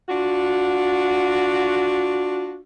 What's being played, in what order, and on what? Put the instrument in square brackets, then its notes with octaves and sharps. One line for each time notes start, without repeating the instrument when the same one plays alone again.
[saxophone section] D4 F4 F#4